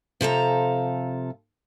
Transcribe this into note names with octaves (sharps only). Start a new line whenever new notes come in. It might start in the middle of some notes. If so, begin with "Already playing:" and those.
C3 F3 A4 A#5